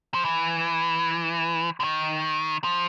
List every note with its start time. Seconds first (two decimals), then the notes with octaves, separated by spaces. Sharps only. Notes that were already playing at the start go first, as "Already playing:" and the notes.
0.14 F3
0.25 E3
1.80 D3
1.84 D#3
2.64 F3